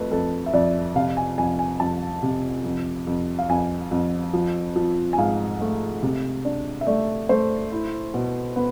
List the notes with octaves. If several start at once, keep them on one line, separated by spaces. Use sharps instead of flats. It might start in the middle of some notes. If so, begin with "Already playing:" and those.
Already playing: F2 A3 B4
F2 A4
E5
F2 D5
C3 F5
G#5
F2 G#5
G#5
F2 A5
C3
F2
F2
F5
F2 G#5
F2
F3
F3
G#5
G#2 F5
A3
C3
D4
E5
A3 D5
A3 C5
E4
B2
B3